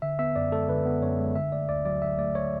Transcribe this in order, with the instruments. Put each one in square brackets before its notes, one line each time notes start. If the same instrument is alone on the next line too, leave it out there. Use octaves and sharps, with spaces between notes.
[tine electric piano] D3 E5
B3 E5
F#2 D5
G#3 A4
D3 B4
B3
F#2 C#5
G#3
D3 E5
A3 D5
D2 D5
F#3 D5
D3 E5
A3 D5
C#5